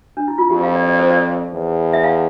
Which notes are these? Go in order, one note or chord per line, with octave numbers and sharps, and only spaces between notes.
D4
E4
F4
F2 G4
F5
D5
D5
C5
D5
E2
E5
F5